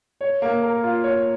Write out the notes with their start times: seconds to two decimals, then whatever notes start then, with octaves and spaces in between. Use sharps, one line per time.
0.21 C#5
0.42 A#3
0.62 A#4
0.84 F4
1.04 C#5